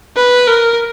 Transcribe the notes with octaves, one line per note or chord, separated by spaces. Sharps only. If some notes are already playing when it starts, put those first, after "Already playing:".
B4
A#4